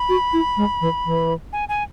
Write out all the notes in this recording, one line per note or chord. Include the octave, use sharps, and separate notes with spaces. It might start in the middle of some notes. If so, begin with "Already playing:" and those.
Already playing: B5
F#4
E4
G#3
E3
E3
G#5
G#5